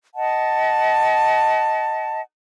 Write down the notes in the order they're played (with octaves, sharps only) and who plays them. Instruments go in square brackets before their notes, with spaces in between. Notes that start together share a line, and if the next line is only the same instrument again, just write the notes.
[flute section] D#5 F#5 A5